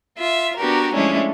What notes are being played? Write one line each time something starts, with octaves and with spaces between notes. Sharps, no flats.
F4 E5
B3 D4 F#4 G4 A#4
F3 G#3 A3 C#4 D4 E4